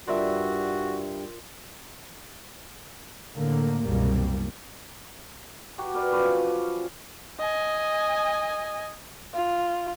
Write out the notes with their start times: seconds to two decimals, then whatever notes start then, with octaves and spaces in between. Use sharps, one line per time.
0.08 G2 G3 D4 F4 F#4 A#4 E5 C6
3.35 A2 D3 A#3
3.85 F#1 C2 B2 G3 A#3
5.78 F#4 G4 A#5
5.94 A#4 B4 D5
6.12 F3 F#3 C#4 B4
6.38 C#4
7.39 D#5 G#5
9.34 F4